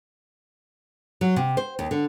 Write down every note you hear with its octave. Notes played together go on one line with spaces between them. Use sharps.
F#3
C3
C5
D#2
D3